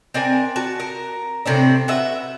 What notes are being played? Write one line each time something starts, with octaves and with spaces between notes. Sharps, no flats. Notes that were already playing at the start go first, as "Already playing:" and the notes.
C4 D4 A#4 G#5
F#4 A5
A#4
A2 C3 C4 D4
F#4 B4 E5